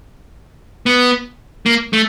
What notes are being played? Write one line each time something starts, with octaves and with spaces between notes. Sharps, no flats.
B3
A#3
A3